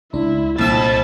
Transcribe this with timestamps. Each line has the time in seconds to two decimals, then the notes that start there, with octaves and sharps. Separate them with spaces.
0.13 C#2 D4 E4
0.58 C2 F2 A#2 E5 A5